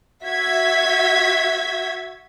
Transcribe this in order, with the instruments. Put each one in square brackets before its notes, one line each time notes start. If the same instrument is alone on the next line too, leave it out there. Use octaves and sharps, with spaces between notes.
[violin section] F#4 E5 G#6 B6